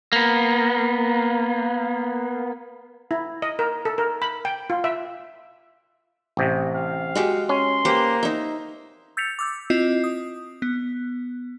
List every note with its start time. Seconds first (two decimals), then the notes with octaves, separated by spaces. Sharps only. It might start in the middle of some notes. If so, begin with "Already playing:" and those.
0.13 A#3 B3
3.11 E4
3.42 D#5
3.59 A#4
3.85 A4
3.98 A#4
4.22 B5
4.45 G5
4.70 F4
4.84 E5
6.37 A1 C3
6.75 F5
7.15 G#3 F#4 G4
7.49 C#4 C6
7.85 A#3 G4 B4 C5
8.23 D#4 E5
9.17 E6 G6 A6 B6 C#7 F7
9.39 D6 E6 G6
9.70 C4 E4 F4 D#5
10.04 D#6
10.62 B3